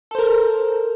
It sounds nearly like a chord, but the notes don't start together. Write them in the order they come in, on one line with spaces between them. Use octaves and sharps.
A4 C5 A#4